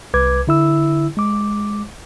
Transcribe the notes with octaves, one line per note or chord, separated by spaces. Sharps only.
C2 B4 D6 G#6
D3 E4 E6
G#3 D6